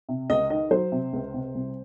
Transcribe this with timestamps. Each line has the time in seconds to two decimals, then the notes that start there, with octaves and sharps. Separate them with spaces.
0.09 C3
0.30 C#2 D#5
0.50 D#3 D#5
0.71 F#3 C5
0.92 C3
1.13 C#2
1.34 C3
1.55 C2